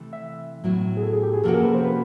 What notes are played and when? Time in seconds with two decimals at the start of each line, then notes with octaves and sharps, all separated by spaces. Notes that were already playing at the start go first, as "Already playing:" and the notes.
Already playing: C3 E3 A3
0.13 E5
0.64 A2 F#3 B3 E4
0.97 G#4
1.03 A4
1.13 G#4
1.23 G4
1.33 G#4
1.43 C3 F3 A#3 C#4 F#4 A4
1.54 A#4
1.64 B4
1.74 C5
1.84 B4